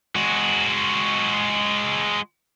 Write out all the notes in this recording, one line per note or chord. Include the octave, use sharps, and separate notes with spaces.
G#3 F#4